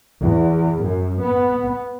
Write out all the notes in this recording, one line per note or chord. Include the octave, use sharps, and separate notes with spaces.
E2
F#2
B3